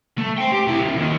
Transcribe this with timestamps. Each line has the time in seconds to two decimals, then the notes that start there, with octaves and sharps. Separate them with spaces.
0.18 A3
0.38 C5 G5
0.52 G4
0.67 C3 E4
0.82 C#3 F3
0.96 D#3 A#3